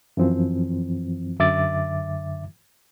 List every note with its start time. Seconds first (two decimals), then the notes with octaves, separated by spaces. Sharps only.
0.17 F#2 E3 F3 C4
1.39 F#2 D3 E5 D6 A6